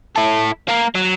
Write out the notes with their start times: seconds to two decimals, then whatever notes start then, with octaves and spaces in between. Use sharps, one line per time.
0.16 E4 A4
0.68 A#3 A#4
0.95 F#3